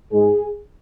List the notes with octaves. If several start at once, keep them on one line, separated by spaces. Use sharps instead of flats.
G#2 G#3 G#4